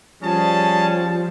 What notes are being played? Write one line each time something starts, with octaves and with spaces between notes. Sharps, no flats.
F3 G3 C#4 G#4 A5